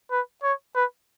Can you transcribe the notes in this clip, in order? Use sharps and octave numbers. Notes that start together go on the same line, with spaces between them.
B4
C#5
B4